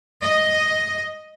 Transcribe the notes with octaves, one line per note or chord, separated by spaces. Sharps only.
D#5